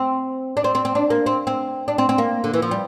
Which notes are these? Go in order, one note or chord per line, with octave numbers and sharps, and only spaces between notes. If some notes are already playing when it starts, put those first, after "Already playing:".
Already playing: C4
D4
C4
C4
C4
D4
A#3
C4
C4
D4
C4
C4
A#3
D3
E3
F3
G3